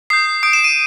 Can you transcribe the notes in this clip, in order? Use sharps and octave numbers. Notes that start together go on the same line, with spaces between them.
D#6 G6 C7
D#6 G6 D7
E7
D#7